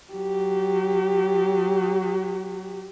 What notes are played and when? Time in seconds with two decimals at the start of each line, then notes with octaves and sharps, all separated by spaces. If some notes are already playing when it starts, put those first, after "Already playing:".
0.13 F#3 G4